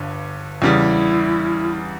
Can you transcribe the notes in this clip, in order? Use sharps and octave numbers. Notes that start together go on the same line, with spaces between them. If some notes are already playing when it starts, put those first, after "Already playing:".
Already playing: G1 G2
E2 C#3 G3 E4